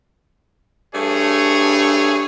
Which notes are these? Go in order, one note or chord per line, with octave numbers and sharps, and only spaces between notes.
G2 A3 G#4 C#5